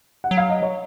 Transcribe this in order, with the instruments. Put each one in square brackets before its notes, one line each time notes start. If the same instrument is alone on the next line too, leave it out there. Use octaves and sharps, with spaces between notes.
[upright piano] F#5
[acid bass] F#3
[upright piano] F5
D#5
C#5